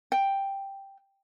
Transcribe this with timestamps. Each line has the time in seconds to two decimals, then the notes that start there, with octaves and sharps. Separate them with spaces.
0.12 G5